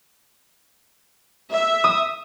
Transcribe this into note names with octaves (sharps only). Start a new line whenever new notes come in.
E5
D#6